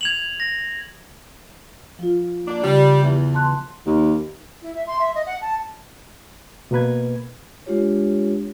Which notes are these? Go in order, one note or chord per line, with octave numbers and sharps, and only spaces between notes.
G#6 F7 F#7
A#6
F3 F4
A#3 D4
C#3 G3
E2 E3
A5 C6 F#6
D#2
E4
E5
C6
E5
D#5
F#5
A5
B2 A#3 B4 G#6
G#3 D4 F4 G4 C#5